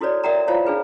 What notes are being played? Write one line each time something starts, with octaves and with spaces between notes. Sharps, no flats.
E4 F#4 A4 B4 C#5 D5
A#4 D5 E5 F#5 G5 A#5
E4 F4 C5 C#5 F5
D4 G#4 B4